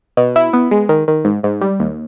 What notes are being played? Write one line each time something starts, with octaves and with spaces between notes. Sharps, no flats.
B2
E4
B3
G#3
D#3
D#3
G#2
G#2
G3
D#2